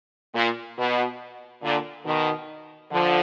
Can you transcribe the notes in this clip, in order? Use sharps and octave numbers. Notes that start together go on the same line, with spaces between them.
A#2
B2
A#2 D3
B2 D#3
D3 F3